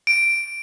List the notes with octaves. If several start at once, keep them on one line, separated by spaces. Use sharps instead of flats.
D7